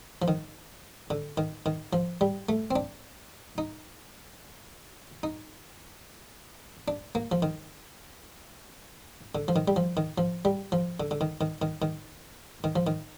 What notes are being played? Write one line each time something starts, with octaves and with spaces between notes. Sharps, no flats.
F3
D#3
D3
D#3
D#3
F3
G3
A3
C4
D4
D#4
D#4
D4
A#3
F3
D#3
D3
F3
D#3
G3
F3
D#3
F3
G3
F3
D3
D3
D#3
D#3
D#3
D#3
D#3
F3
D#3